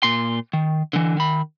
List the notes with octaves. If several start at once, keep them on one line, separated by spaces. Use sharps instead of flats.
A#2 C6
D#3
D3 E3
D#3 B5